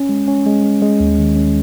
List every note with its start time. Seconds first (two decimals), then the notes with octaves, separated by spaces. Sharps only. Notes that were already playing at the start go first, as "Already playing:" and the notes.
Already playing: C#4
0.09 G#3
0.27 C#4
0.46 G#3
0.63 G#3
0.82 G#3
1.00 D#2
1.19 D#3
1.36 C#4